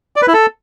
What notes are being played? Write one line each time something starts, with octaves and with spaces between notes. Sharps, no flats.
D5
B4
E4
A4